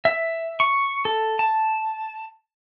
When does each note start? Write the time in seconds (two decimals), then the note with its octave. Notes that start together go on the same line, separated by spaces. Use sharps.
0.05 E5
0.60 C#6
1.05 A4
1.39 A5